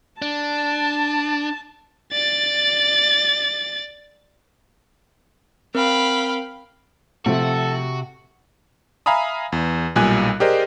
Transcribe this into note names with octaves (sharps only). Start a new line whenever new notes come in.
D4 A5
D5 A6
C4 A#4 F5 G5 B5
C3 F3 A3 F#4 A4
E5 F5 G#5 A#5 B5 D#6
E2
B1 A#2 G3 G#5 F#6
G4 G#4 A#4 C5 D5 D#5